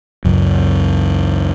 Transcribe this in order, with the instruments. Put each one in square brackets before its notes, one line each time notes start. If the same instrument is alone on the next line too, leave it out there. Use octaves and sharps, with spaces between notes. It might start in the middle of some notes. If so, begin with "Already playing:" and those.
[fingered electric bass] C#2 F#2